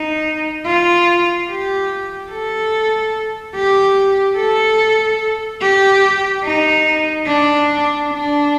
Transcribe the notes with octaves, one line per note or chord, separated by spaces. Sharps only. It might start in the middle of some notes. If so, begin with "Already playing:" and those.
Already playing: D#4
F4
G4
A4
G4
A4
G4
D#4
D4
D4